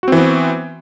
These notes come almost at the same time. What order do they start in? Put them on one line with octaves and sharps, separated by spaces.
F#4 C4 E3 B3